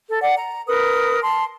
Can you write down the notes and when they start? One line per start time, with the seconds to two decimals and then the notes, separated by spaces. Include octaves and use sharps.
0.08 A4
0.22 D5 F#5
0.38 A#5
0.68 A#4 B4 D#6
1.22 A5 C6